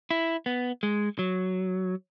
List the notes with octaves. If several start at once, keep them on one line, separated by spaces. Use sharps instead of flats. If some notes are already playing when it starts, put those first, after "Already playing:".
E4
B3
G#3
F#3